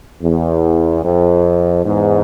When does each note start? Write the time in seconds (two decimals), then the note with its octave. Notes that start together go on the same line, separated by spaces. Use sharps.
0.22 E2
1.04 F2
1.86 E2 G#2